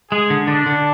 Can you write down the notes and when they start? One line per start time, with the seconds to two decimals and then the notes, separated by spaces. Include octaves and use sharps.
0.11 G#3 G#4
0.30 D3
0.47 D3 D4
0.66 D3